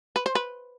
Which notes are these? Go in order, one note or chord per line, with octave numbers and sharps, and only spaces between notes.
B4
C5
B4